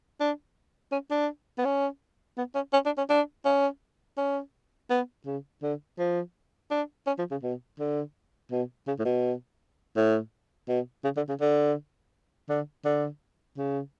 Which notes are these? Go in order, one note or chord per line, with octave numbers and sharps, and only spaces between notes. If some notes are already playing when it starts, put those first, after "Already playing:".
D4
C#4
D4
B3
C#4
B3
C#4
C#4
D4
C#4
D4
C#4
C#4
B3
C#3
D3
F3
D4
C#4
F3
C#3
B2
D3
B2
C#3
A2
B2
A2
B2
C#3
D3
C#3
D3
D3
D3
C#3